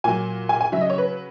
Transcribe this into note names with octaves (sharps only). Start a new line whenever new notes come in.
A#2 F#3 G#5
G#5
G#5
C#3 F#3 E5
D#5
C#5
B4